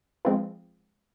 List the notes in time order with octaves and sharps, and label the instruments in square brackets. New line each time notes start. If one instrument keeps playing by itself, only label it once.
[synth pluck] F3 G#3 C4 F4 B4